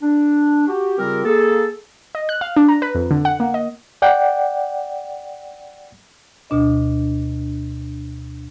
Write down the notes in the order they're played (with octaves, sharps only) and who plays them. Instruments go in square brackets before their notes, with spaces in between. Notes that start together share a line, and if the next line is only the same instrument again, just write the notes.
[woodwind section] D4
F#4 G4
C#3 G3 C4 F4 G4 A#4
A#3 G#4 A4
[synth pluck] D#5
F#6
F5
D4
A#5
B4
F2
D3
F#5
A#3
D#5
[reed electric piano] D5 F#5 G5
[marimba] D2 B2 D4 D#5